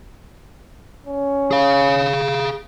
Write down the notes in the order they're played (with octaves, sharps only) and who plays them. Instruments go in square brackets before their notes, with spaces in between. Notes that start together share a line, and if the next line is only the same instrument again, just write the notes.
[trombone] C#4
[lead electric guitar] G#4 F5